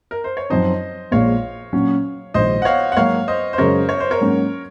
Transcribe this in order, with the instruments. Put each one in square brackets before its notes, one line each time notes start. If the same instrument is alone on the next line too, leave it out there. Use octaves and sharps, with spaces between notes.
[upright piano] A#4
C5
C#5
[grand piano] F#2 F3 C4 D#4 [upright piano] C5 D#5
[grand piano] A#1 A#2 G#3 [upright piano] C#5 F5
[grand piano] A#2 F#3 C#4
[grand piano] A#1 G#2 D#3 [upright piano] C5 D#5
[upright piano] F#5
C#5 F5
F#5
[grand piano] G#2 F#3 A#3 [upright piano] C#5 F5
[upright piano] C5 D#5
C5
[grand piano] F#2 C#3 G#3 C#4 F#4 [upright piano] A#4 C#5
[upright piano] C#5
C5
A#4 C#5
[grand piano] G#2 F#3 A#3 C#4